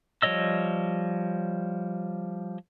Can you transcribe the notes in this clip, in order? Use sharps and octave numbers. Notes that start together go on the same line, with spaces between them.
F3 G3 C#5 D#5 E6